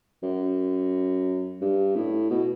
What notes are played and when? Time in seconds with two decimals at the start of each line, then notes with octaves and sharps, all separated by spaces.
0.23 F#2
1.61 G2
1.96 A2
2.30 B2